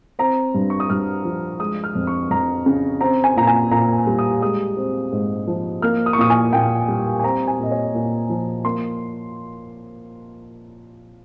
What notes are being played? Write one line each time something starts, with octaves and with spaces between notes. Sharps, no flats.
C4 A#5
G2
C#6
D#6
G2 F6
F3
G#3 D#6
F6
F2
C#6
F2 A#5
C#3
C4 A#5
G#5
A#2 A#5
G#5
A#2 A#5
G3
D#6
G#3 D#6
C4
G#2
F3
A#3 F6
D#6
C#6
A#2 D#6
G#5
A#2 G5
G3
G#5
C4 A#5
G#5
A#2 D#5
C#5
A#2
F3
A#3 C6